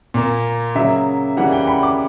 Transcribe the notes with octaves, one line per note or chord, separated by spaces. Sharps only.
A#2 A#3
C#3 F#3 A#3 E5
C#3 E3 G3 A#3 F#5
G5
B5
D6